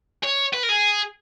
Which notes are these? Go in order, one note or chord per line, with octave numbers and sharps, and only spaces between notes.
C#5
B4
A#4
G#4